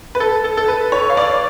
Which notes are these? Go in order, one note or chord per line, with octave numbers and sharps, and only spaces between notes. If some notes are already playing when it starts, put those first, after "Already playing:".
B4
A4
A4
A4
B4
C#5
F5
D5